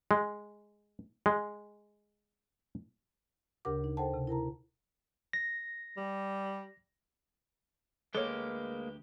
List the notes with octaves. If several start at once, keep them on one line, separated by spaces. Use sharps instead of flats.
G#3
G#3
D2 C#3 G4 A#4 F#5 D6
D#4
A4 C5 F#5 G5 A5
C3
E4 A#4 A5 A#5
A#6
G3
D2 G#3 A#3 G4 A4 B4 C#5